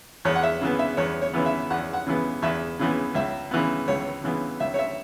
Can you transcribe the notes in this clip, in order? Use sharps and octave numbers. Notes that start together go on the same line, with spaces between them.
E2 C#5
F#5
E5
C#3 E3 B3
E5
E2 C#5
C#5
C#3 E3 B3
E5
E2 F#5
F#5
C#3 E3 B3
E2 E5
C#3 E3 B3
C#2 E5
C#3 E3 B3
C#2 C#5
C#3 E3 B3
C#2 E5
C#5
E5